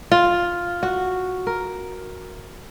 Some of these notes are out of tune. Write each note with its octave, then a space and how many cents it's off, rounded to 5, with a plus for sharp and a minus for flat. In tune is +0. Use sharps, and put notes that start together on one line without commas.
F4 +5
F#4 -5
A#4 +5